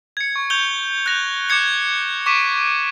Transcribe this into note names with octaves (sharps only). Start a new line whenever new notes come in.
G#6 C#7
C#6
C#6 G6 F7 G7
F#6 G6 A#6 F7
D6 F#6 G#6 C#7 G7
C#6 D6 B6 D#7